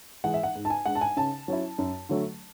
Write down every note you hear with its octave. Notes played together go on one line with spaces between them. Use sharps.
E3 G#3 F#5
E5
F#5
G#2
A5
G#5
G#3 D4 F#5
A5
G#5
C#3 A5
F#3 C#4 E4
F#2
D3 F#3 A3